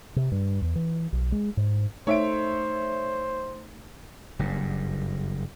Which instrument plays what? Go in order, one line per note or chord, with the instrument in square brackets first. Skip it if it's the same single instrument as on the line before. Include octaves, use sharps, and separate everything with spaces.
[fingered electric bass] C3
G2
E2
E3
B1
G#3
G#2
[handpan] A3 D#4 [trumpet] C5 [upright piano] C#5 E5 D7
[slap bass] F#1 G2